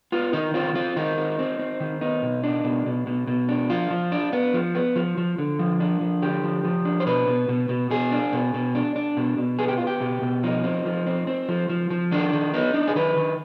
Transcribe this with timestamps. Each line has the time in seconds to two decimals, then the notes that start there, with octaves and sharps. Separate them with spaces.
0.12 B3 F4
0.33 D#3 D#4
0.54 C4 F4
0.75 C4 F4
0.96 D#3 D#4
1.17 C4
1.39 C4
1.59 C4
1.80 D#3
2.01 B3 D#4
2.22 B2
2.44 D4
2.64 B2
2.86 B2
3.07 B2
3.27 B2
3.49 D4
3.70 F3 F4
3.90 F3
4.12 D4
4.33 B3
4.54 F3
4.75 B3
4.96 F3
5.17 F3
5.38 D3
5.59 F3
5.80 D4
6.01 F3
6.22 D3 G4
6.43 F3
6.65 F3
6.85 D4
7.00 C5
7.06 B2 B4
7.28 B2
7.49 B2
7.69 B2
7.91 B2 G#4
8.12 D4
8.33 B2
8.54 B2
8.75 D4
8.96 D4
9.17 B2
9.38 B2
9.59 B3 G#4
9.68 G4
9.77 B3 F4
9.87 G4
10.01 B2
10.22 B2
10.43 F3 D#4
10.64 C4
10.85 F3
11.06 C4
11.27 C4
11.49 F3
11.69 F3
11.90 F3
12.11 D#3 D4
12.33 D#3
12.53 B3 D#4
12.74 D4
12.88 G#4
12.95 D#3 B4
13.16 D#3